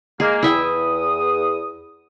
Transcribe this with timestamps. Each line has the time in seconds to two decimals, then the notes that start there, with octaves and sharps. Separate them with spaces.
0.20 G#3 A#3 G#4
0.43 E2 E4 E5 G5 D#6